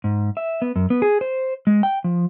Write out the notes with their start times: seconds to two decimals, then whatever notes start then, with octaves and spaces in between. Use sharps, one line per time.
0.04 G#2
0.37 E5
0.62 B3
0.76 F#2
0.90 B3
1.02 G#4
1.21 C5
1.67 G#3
1.83 G5
2.04 F3